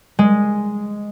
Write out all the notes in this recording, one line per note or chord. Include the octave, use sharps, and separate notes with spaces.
G#3